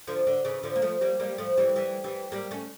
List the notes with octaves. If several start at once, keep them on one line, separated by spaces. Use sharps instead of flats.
D3 F3
D3
C#3 E3
D3 F3
A#3
F3 A3
G3 A#3
G3 A#3
F3 A3
E3 G3
E3 G3
E3 G3
G3 A#3
A3 C#4